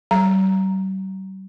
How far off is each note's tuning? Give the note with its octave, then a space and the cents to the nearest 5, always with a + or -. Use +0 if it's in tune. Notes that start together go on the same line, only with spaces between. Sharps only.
G3 -45 A#5 +0